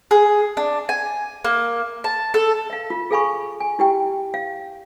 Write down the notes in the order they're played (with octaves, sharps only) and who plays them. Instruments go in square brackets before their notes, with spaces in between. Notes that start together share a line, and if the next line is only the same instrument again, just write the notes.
[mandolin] G#4
D4
G#5
A#3
A5
A4
[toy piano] E5 F5
F4
G#4 A4 F5 G#5 B5 C#6
G#5
E4 G4 G5
F5